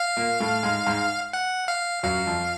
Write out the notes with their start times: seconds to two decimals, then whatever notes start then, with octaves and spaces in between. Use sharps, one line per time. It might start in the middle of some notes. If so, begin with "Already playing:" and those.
Already playing: F5
0.17 A#2 A#3
0.40 A2 A3
0.63 G#2 G#3
0.87 G#2 G#3
1.33 F#5
1.68 F5
2.03 F#2 F#3 F5
2.26 F2 F3